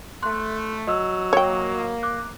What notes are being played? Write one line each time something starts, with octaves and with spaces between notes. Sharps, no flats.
A3 C6 F#6
F#3 D#5 E6
A#3 C#5 G5
D6 F#6